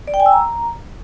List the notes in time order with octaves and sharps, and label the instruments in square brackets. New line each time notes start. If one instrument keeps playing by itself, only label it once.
[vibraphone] D5
G5
G#5
E6
A#5